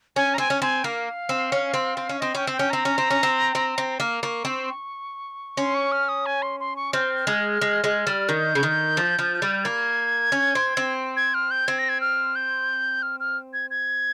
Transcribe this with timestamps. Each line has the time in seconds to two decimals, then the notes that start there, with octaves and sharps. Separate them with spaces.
0.16 C#4 G#5
0.34 A#5
0.38 C4 G#5
0.50 C#4
0.62 C4 G#5
0.84 A#3 F5
1.29 C4
1.52 C#4
1.74 C4
1.97 C4
2.09 C#4
2.20 C4 D#5
2.35 C#4 G5
2.47 C4
2.53 G5
2.59 C#4
2.70 C4 A#5
2.85 C#4
2.98 C4
3.10 C#4
3.23 C4
3.55 C4
3.78 C4
4.00 A#3
4.23 A#3 C#6
4.45 C4
5.57 C#4 C6
5.75 C#6
5.92 F6
6.09 D#6
6.26 G#5
6.42 C6
6.60 C6
6.76 C#6
6.93 C4 F6
7.27 G#3
7.61 G#3
7.84 G#3
8.07 G3
8.29 D#3 G6
8.55 C#3
8.63 D#3
8.97 F3
9.19 F3
9.42 G3
9.64 A#3 G#6
10.32 C#4
10.55 C4
10.77 C4
11.17 G#6
11.34 F6
11.51 G6
11.67 C4 G#6
11.79 A#6
11.89 G#6
12.01 F6
12.36 G6
13.02 F6
13.20 F6
13.53 G#6
13.70 G#6